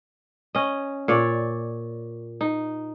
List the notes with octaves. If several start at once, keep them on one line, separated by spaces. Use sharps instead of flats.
C#4 D#5
A#2 C#5 D5
D#4